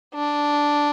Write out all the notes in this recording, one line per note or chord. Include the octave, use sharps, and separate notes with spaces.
D4